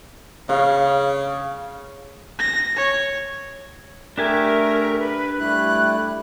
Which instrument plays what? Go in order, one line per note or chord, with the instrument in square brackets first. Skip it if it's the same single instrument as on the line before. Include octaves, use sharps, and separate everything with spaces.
[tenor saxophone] C#3 [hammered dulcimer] F5
[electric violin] A#6
C#5
[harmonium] A3 E5 [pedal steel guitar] D4 G4 G#5 [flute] A#4
[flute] B4
[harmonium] G3 A3 E4 [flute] F#6